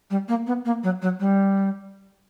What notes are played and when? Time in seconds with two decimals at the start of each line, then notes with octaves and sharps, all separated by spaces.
0.10 G3
0.28 A#3
0.47 B3
0.65 A#3
0.83 F#3
1.02 F#3
1.20 G3